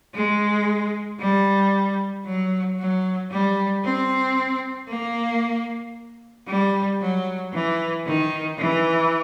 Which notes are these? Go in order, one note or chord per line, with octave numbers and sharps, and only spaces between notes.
G#3
G3
F#3
F#3
G3
C4
A#3
G3
F#3
E3
D#3
E3